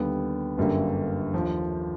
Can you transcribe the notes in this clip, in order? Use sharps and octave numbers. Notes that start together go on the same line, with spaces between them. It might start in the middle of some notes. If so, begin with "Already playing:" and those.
Already playing: D#2 D3 G3 B3
G1 F#2 D3 G3 A#3
D#2 D3 F3